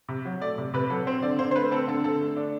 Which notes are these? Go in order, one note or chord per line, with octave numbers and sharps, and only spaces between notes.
C3
F#3
A3 D5
C3
C3 B4
F#3 A4
C4 C5
D3 D5
D3 C5
C5
A3 B4
C4 A4
D3 A4
D3 A4
A3
D4